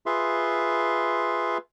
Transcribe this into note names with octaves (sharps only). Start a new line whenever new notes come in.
F4 G#4 B4 E5 C6